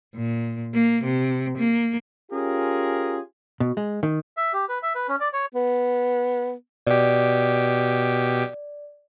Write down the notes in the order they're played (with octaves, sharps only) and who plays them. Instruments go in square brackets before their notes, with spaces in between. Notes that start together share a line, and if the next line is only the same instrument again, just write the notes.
[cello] A#2
A#3
C3
A#3
[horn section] C#4 F4 G4 G#4 A#4
[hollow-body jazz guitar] B2
G#3
D#3
[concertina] E5
G4
B4
E5
B4
C#4
D5
C#5
[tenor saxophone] B3
[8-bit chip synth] B2 G4 [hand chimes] D5